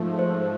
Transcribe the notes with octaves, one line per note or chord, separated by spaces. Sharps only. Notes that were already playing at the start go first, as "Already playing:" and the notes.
Already playing: G#2 F3 A3
C5